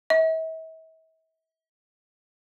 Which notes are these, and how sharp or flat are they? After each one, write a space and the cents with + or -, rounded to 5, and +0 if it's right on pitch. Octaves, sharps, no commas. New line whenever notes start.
E5 -40